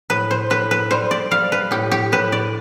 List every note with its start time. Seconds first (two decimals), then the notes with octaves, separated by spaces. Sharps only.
0.10 A2 B4
0.31 C5
0.50 A2 B4
0.71 B4
0.91 G3 C5
1.11 D5
1.31 G3 F5
1.52 B4
1.71 A2 G4
1.91 G4
2.12 A2 B4
2.32 D5